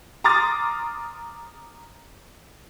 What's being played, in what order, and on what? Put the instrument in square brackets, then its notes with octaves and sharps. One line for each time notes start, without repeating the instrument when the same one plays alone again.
[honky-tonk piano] A#5 C6 D6 D#6 F6 A6